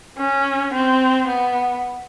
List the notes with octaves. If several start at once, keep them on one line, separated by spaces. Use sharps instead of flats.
C#4
C4
B3